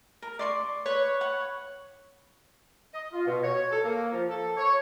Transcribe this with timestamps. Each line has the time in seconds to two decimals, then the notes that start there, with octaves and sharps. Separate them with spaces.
0.22 A#4
0.39 D5 C6 C#6
0.86 B4 C#5
1.21 F#5
2.93 D#5
3.13 F4
3.26 B2
3.43 C#5
3.70 A4
3.85 A#3
4.12 F3
4.29 A4
4.57 C#5